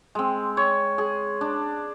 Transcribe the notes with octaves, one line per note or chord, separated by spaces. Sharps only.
G#3 C4
C#5
G#4
D4